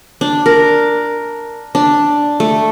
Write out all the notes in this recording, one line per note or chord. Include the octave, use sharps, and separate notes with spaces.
D4
A#4
D4
A3